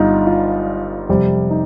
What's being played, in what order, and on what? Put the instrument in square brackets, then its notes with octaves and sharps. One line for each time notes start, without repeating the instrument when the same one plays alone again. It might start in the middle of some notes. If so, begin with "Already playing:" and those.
Already playing: [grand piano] G1 G2 G3 D#4 F4
F4
F2 C3 G3
D#4